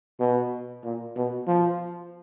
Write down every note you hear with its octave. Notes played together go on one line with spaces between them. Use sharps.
B2
A#2
B2
F3